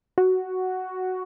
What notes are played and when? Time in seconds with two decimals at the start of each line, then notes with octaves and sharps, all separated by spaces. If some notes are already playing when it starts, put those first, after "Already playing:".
0.18 F#4